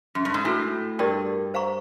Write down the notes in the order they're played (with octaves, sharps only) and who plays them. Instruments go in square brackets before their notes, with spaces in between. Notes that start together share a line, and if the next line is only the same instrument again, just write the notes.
[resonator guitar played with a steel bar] F#2
G2
G#2
[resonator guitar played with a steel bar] A2 [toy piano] D4 F#4 A4
[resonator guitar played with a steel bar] G2 [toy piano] G4 A#4 D5 G5
[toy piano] C5 F5 A#5 C#6